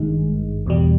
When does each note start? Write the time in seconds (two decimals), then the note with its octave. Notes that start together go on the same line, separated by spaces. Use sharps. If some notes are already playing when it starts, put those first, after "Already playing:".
Already playing: G#1 G2 D#3 G#3
0.66 E2 B2 G3